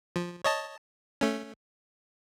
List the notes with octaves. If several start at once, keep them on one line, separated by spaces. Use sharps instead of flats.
F3
C#5 D#5 A5
A3 C#4